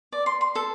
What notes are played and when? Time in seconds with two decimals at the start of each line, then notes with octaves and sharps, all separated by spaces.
0.12 D5
0.26 C6
0.41 C6
0.55 A4